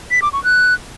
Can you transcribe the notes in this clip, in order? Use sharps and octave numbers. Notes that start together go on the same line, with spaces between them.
B6
D6
C#6
F#6